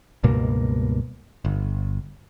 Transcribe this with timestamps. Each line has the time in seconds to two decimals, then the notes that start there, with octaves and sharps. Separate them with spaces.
0.23 C#2 G2 B2 A#3
1.45 G1